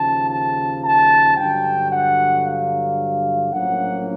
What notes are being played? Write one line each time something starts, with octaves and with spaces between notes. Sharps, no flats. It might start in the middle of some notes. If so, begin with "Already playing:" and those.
Already playing: D#2 C#3 F3 A5
A5
A5
G2 D3 F#3 G5
F#5
F5
A#1 A2 F#3 A#3 C#4 F#5